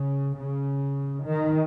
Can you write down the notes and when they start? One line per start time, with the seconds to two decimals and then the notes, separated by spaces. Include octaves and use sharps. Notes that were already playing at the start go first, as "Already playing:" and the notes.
Already playing: C#3
0.38 C#3
1.26 D#3